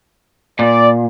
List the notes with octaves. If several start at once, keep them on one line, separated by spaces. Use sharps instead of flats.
A#2 D5